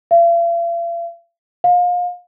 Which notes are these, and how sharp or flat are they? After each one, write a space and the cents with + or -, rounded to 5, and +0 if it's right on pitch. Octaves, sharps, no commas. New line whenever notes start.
F5 -45
F5 +30